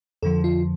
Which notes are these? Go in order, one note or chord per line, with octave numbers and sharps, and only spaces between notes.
F2 D3 F3 A4
F4